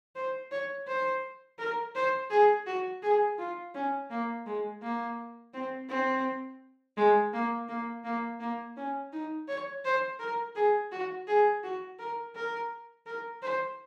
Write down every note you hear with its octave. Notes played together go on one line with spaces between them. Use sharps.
C5
C#5
C5
A#4
C5
G#4
F#4
G#4
F4
C#4
A#3
G#3
A#3
C4
C4
G#3
A#3
A#3
A#3
A#3
C#4
D#4
C#5
C5
A#4
G#4
F#4
G#4
F#4
A#4
A#4
A#4
C5